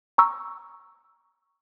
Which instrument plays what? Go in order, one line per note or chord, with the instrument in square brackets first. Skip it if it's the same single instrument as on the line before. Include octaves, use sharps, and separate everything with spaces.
[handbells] A#5 C#6 E6